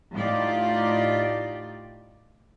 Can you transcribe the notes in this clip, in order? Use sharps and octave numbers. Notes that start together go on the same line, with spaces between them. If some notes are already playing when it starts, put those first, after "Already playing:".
A2 D#4 F4 G4 D5